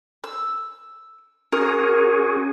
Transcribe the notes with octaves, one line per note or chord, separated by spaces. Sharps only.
E6
C#4 F#4 G#4 A#4